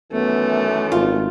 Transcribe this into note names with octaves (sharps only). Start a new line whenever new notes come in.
F#2 D#3 E3 A3 B3
G#1 F4